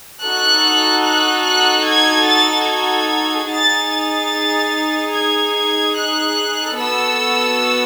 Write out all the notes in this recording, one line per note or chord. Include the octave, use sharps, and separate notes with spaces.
D#4 F#4 A4 F#6
F#6
F#6
G#6
A6
G#6
D#4 G#4 A6
A6
G#6
G#6
F#6
B3 F#4 A4 E6